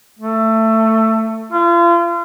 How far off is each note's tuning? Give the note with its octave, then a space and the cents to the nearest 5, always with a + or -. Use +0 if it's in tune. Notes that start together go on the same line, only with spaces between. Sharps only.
A3 +15
F4 -35